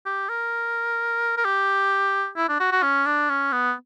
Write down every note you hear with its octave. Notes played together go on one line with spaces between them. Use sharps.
G4
A#4
A#4
G4
E4
D4
F#4
F#4
C#4
D4
C#4
B3